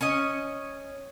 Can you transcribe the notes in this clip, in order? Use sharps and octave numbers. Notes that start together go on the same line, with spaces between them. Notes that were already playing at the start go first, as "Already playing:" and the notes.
C#4 C#5 D#5